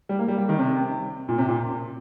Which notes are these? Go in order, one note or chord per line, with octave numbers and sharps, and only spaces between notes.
G3
A#3
G3
G3
D#3
C3
A#2
C3
A#2